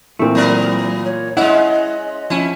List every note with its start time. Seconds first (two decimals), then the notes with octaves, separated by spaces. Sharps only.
0.19 A#2 E3 A3 C4 E4
0.35 F#3 B3 A#4
1.05 C#5
1.37 G#3 C#4 E4 D#5 F#5
2.30 F3 C#4 E4